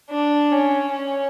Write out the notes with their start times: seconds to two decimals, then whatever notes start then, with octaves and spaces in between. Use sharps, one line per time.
0.10 D4
0.52 C#4
0.93 C#4